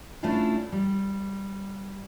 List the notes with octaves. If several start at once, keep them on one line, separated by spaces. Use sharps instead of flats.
A3 C#4 D4 E4 F4 G#4
G3